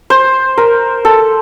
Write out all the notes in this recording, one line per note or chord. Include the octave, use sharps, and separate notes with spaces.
C5
A#4
A4